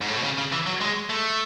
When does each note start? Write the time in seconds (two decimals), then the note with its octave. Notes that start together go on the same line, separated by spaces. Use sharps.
0.01 G#2
0.08 A2
0.16 B2
0.24 C#3
0.38 C#3
0.52 E3
0.66 F#3
0.81 G#3
1.10 A3